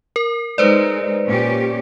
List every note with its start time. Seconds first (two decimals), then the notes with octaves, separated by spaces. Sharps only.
0.16 A#4
0.58 G#3 D#4 B4 C5 D5
1.25 A#2 C#4 G4